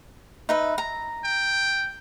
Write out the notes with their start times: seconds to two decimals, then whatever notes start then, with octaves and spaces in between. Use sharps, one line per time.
0.49 D#4 B4 E5
0.78 A#5
1.24 G5